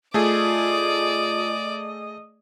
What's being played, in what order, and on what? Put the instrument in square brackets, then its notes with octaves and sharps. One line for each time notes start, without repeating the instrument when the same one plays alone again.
[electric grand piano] A3 G#4 [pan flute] F4 [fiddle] D5 [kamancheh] D#5